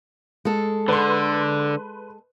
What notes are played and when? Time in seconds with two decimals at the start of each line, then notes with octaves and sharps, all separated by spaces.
0.45 G#3 A4
0.88 D3 B4 C6